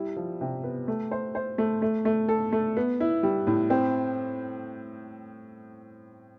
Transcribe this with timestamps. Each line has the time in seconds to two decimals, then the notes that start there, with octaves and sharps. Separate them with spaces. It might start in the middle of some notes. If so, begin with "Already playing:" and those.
Already playing: G3 E4
0.17 F3
0.41 C3
0.64 B3
0.88 A3
1.11 C5
1.35 C5
1.58 A3
1.82 A3
2.05 A3
2.29 A4
2.52 A3
2.77 B3
3.00 E4
3.23 G3
3.47 A2
3.70 C4